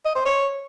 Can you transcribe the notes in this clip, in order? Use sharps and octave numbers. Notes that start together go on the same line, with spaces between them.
D#5
C5
C#5